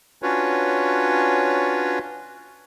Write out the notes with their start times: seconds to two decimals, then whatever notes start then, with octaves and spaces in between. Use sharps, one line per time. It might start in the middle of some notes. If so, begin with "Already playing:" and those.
0.22 C#4 D4 F4 F#4 B4 C#5